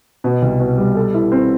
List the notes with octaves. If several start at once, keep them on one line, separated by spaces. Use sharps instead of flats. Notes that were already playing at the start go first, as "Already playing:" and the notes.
B2
C2
B2
G3
A4
E4
C4